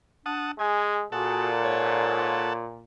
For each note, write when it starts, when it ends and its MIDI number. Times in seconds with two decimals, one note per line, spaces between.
0.26 0.52 62
0.26 0.51 78
0.26 0.51 81
0.26 0.51 87
0.59 1.04 56
0.59 1.05 68
0.59 0.95 80
1.12 2.83 46
1.12 1.50 66
1.12 1.49 68
1.12 2.53 69
1.12 2.53 78
1.12 2.53 81
1.64 2.43 44
1.64 2.67 73